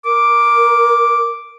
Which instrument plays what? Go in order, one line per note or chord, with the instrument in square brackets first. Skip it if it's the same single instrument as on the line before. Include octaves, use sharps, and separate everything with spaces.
[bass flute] A#4 [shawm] D6